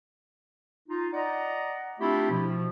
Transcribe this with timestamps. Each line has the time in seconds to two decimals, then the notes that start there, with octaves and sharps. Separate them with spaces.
0.89 D#4 F4
1.13 D5 D#5 F#5 A#5
1.99 A3 C4 D4 E4 F4 G4
2.30 B2 F3